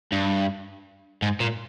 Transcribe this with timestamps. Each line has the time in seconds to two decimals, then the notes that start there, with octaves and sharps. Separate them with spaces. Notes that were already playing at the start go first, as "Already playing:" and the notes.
0.12 G2
1.22 G#2
1.40 A#2